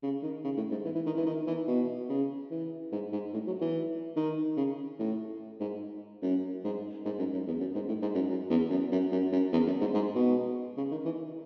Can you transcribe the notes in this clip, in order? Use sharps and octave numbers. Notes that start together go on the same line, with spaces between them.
C#3
D#3
C#3
A2
G#2
E3
E3
D#3
E3
D#3
E3
B2
C#3
E3
G#2
G#2
A2
F#3
E3
D#3
C#3
A2
G#2
F#2
G#2
G#2
F#2
F#2
E2
F#2
G#2
A2
G#2
F#2
F#2
E2
F#2
F#2
F#2
F#2
E2
F#2
G#2
G#2
B2
C#3
D#3
E3